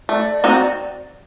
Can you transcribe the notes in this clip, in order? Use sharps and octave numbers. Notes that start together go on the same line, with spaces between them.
A3 D5
D#5
C4 D#4 F#4 D5